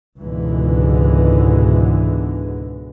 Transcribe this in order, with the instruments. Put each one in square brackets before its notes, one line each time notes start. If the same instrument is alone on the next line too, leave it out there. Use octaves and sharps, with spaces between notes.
[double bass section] C#2 G#2 B2 D3 E3 G#3